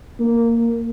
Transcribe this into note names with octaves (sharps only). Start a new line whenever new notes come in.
A#3